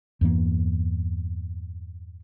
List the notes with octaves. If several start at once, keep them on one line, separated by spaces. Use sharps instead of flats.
E2 G2 E3 A#3